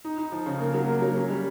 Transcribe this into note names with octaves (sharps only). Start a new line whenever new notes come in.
D#4
D#4
F3
C#3
A#3
F#3
A#3
F#3
C#4
G3